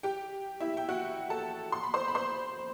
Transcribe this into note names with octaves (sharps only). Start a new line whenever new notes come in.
G4 G5
E4 E5
G5
F#4 F#5
A4 A5
C6
B5
C5 C6
B5
C5 C6